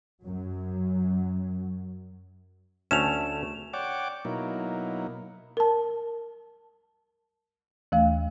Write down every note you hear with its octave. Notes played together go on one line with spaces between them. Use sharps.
F#2 F#3
D2 A3 C#4 E7 F7
C#5 D5 F#5 G5 D6
B2 F#3 A#3 D#4 E4
A#4 A5
D#2 E3 A3 F5